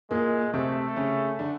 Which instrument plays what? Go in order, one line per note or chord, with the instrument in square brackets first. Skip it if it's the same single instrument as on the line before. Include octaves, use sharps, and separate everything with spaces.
[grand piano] A#2 A#3 [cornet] G#3
[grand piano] C3 C4 [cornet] A3
[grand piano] C#3 C#4
D3 D4